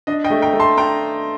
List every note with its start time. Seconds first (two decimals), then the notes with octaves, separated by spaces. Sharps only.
0.07 D4 D#5
0.24 D#5 G5
0.30 A3
0.42 G5 A#5
0.53 A3
0.60 A5 C6
0.77 D4 G5 A#5